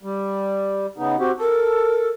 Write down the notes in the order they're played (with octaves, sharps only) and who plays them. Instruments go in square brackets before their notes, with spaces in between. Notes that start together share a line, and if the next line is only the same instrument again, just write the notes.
[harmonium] G3
C#3 B3 D#4
C4 F#4 G4
[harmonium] A4 [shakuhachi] A#4